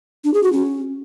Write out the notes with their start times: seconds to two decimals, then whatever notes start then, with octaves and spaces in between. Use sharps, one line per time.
0.25 D4
0.34 G#4
0.43 F#4
0.53 C#4